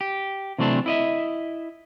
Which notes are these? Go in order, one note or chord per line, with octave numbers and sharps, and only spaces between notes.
G4
C3 E3 F#3 A3 C4 D4
E4 D#5 E5